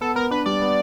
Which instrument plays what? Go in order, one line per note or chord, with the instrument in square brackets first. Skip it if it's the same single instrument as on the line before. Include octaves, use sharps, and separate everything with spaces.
[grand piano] B3 [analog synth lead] A4
[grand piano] B3 [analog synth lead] A#4
[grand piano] D4 [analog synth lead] B4
[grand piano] G3 [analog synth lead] D5
[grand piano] B3